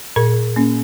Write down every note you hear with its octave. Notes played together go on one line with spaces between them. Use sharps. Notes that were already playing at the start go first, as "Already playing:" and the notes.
A#2 A#4
A#3 C#4